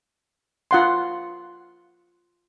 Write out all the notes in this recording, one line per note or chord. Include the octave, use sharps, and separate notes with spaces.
F4 F#5 C6